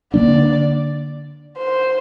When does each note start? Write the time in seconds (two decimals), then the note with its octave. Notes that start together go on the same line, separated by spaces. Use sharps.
0.13 D3 A#3 D4 D5
1.58 C5